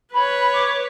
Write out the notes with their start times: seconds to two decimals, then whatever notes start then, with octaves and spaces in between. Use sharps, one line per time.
0.13 B4 C#5 B5
0.53 D6